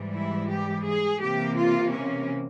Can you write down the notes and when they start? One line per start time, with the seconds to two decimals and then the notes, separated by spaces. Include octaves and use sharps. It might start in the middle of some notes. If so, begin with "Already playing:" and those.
Already playing: G#2 E3 G3
0.12 E4
0.48 G4
0.83 G#4
1.19 C3 E3 A#3 G4
1.54 F4
1.89 C#4